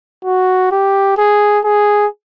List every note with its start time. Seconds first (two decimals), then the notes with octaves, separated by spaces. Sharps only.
0.25 F#4
0.71 G4
1.17 G#4
1.64 G#4